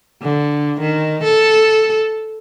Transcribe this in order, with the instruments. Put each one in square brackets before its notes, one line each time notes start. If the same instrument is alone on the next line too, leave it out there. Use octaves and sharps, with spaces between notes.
[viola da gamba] D3
D#3
A4